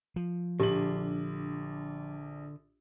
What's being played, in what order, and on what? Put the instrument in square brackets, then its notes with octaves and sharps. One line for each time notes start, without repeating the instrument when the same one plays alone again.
[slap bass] F3
[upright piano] A#1 F#7 [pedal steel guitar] D3 [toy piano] G4